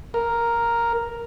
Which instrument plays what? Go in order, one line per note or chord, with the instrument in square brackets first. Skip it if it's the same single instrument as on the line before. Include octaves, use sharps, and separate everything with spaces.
[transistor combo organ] A#4